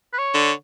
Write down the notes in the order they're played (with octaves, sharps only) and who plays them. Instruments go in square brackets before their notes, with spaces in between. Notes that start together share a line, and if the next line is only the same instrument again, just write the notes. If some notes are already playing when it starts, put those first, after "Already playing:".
[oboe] B4
C#5
[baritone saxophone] D3